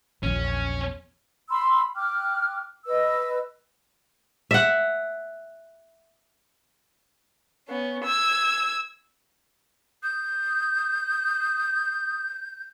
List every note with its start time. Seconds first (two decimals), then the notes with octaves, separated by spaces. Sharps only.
0.23 A#1 E2 C#4
1.50 B5 C6 E6
1.96 G5 D6 F6 F#6
2.86 B4 D#5 E6
4.51 E5 F#5
7.69 B3 C#4
8.05 E6 G#6
10.03 D#6 G6